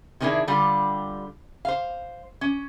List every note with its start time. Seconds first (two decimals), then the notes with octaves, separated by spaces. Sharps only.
0.20 C3 D#3 C#4 D4 E4 G#4
0.48 D3 G3 F4 G4
1.65 C5 F5
2.41 C#4